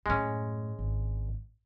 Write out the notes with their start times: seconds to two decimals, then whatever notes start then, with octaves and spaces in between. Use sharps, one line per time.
0.06 F#2 A2 G#3 C#4
0.79 G#1